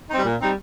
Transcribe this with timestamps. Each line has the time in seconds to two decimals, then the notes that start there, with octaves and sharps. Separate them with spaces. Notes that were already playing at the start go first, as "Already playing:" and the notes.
0.10 G3 C4 D#4
0.25 A#2
0.40 G3 C4 D#4